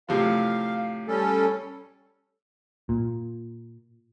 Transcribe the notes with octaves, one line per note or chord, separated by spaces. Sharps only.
A2 C3 F3 F5
G3 C#4 A4
A#2